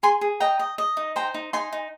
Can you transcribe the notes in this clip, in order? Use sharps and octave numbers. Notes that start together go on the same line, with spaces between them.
G#4 G#5 C6
G#4
D#5 G5 A#5
D#5
D#5
D#4
C5 G5 A#5
D#4
D#4 G#5 C6
D#4